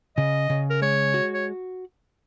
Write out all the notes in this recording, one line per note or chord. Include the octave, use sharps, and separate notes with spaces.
C#3 D#5
C#3
A#4
G#3 C#5
F#4
C#5